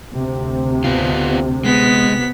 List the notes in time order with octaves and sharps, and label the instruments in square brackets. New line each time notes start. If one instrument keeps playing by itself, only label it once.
[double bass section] D2 C3
[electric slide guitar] B3 F4
[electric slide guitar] G#3 [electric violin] B3 B6